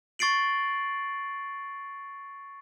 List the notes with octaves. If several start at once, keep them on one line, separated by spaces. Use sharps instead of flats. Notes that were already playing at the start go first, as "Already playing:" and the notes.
C#6 A6 C7 D7 F#7